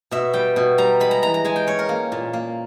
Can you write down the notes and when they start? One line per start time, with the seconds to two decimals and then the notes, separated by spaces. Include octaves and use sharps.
0.11 B2 E5
0.33 G3 G5
0.56 B2
0.78 G3 A#5
1.00 G#3 B5
1.11 A#5
1.22 E3 A#5
1.34 A#5
1.45 G#3 G#5
1.56 G5
1.67 C#4 C#5
1.79 A#4
1.89 A#3
2.12 A#2
2.33 A#3